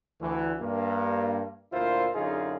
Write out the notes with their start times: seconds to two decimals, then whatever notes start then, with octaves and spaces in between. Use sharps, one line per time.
0.21 D2 E3
0.62 G2 A#3
1.72 D2 A#2 E4 F4 A#4 C5
2.15 F#2 D3 D#4 F4 G#4